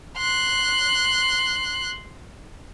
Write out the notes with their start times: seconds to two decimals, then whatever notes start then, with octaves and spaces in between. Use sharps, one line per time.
0.18 C6 F#6